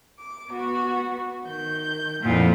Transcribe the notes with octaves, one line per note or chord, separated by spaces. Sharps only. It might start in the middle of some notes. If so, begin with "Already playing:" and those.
D6
B3 F#4
D#3 G6
F2 A#2 E4 F4 F#5